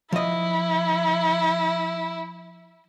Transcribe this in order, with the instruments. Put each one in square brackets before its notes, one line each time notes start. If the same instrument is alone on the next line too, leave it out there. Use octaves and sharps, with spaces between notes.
[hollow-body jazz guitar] F3 D#5 [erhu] E4